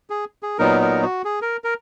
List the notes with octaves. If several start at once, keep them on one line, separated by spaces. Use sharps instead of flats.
G#4
G#4
A#2 F#3 B3 D#4 A#4
A#4
F#4
G#4
A#4
A#4